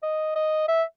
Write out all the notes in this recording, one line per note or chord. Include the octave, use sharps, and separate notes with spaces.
D#5
D#5
E5